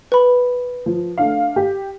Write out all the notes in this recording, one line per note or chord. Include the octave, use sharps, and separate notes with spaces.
B4 B5
F3
A3 D4 F5
G4